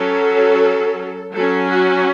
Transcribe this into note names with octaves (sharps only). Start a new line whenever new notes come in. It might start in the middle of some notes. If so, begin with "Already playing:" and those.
Already playing: F#3 C#4 A4
F#3 C#4 A4
F#4